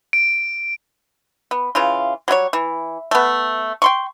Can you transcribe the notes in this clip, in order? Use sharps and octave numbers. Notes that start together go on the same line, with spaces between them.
D7
B3
C#3 E3 F4
F#3 G3 E4 C#5
E3
A3 B3
G5 C6 C#6